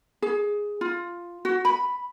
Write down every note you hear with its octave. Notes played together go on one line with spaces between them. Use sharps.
G#4
F4
F#4
B5